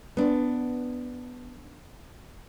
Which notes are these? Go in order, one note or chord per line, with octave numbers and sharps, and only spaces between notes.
B3 D4